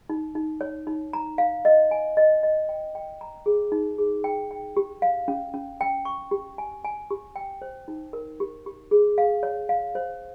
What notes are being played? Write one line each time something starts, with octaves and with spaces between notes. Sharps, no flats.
D#4
D#4
C#5
D#4
A#5
F5
D#5
G#5
D#5
D#5
G5
G5
A#5
G#4
D#4
G#4
G5
G5
G4
F5
C#4
C#4
G5
C#6
G4
G#5
G#5
G4
G5
C5
D#4
A#4
G4
G4
G#4
F5
C#5
F5
C5